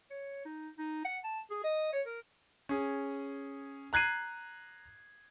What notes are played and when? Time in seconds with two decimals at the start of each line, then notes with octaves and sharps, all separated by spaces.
0.10 C#5
0.45 D#4
0.78 D#4
1.05 F#5
1.24 A5
1.51 G#4
1.64 D#5
1.93 C#5
2.06 A#4
2.69 C#4 G#4
3.93 A#5 F#6 G#6 C7 D#7